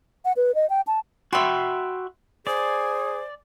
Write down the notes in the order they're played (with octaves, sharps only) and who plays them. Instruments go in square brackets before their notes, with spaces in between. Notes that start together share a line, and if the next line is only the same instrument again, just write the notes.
[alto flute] F#5
B4
D#5
G5
A5
[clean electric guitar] F#4 G5 B5 [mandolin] E5 C6
[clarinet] G#4 [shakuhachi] C5 [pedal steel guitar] D5 [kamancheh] G#5